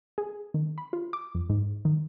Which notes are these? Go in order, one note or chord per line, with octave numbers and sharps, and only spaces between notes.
G#4
D#3
B5
F4
D6
F2
G#2
D#3